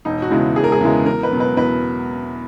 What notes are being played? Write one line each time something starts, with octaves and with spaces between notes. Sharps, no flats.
E1 D#4
F#4
E2 C#3 E3 G#3
E1 G#4
A#4
G#4
E2 C#3 E3 G#3
E2 A#4
B4
B2 F#3
B4
E2 B4